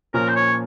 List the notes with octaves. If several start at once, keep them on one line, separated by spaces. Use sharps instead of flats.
A#2 F3 A#3 C#4 A#4
C5
C#5